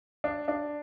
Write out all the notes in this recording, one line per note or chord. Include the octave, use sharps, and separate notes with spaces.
D4
D4